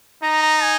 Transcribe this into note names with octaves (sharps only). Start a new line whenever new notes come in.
D#4 A#5
A#5
G#5